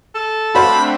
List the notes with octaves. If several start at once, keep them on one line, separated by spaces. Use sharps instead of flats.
A4
A3 C4 D4 F#4 C5 F5 B5